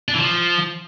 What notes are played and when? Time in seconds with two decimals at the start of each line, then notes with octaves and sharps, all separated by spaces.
0.08 D4
0.14 E3
0.20 F3